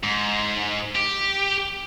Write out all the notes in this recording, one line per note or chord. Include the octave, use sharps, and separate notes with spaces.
G#2
G4